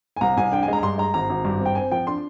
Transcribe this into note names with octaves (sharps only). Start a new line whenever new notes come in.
G#5
C2 A#5
C2 G#5
D4 G5
G#5
G#3 A#5
A#5
G2 C6
G#3 A#5
G#1 A#5
G#1
G2
C4
G5
C4 G#5
F3 G5
D4 C6